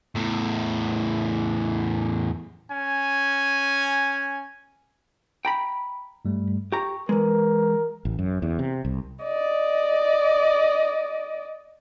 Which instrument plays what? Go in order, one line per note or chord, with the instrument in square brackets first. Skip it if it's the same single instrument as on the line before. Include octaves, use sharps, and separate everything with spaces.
[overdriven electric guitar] E2 A2
[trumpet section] C#4 G#5
[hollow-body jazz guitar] G5 A#5 B5
[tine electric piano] G2 G3 A3
[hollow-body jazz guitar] G4 A#5 [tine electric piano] C#6
[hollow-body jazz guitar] E3 G#3 [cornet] A#4 [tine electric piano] B4
[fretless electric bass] A1
F#2
E2
C3
C2
[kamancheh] D5 D#5